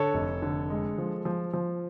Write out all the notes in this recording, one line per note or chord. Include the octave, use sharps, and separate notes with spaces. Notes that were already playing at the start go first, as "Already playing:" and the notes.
Already playing: D3 A4 C#5
F1
D3
G#3
F3
F3
F3